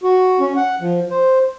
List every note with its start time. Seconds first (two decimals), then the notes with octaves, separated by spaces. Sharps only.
0.03 F#4
0.40 C#4
0.56 F#5
0.81 F3
1.10 C5